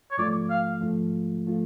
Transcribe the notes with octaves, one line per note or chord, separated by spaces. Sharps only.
C#5
G#2 F3 A3 F4 D5
F5
G#2 F3 A3 F4
F3 A3 F4